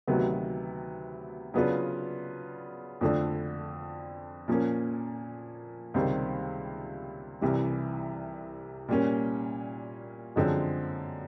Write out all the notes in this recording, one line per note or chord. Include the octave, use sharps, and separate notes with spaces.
D2 C3 D#3 F#3 B3
C#3 F#3 B3 D4 F4
F2 D3 F3 A3 D4
A#2 F3 A#3 C#4
C#2 C3 D#3 G3 C4
C2 C3 E3 G3
A#2 G3 A#3 C#4
F#2 D3 F3 G#3 C4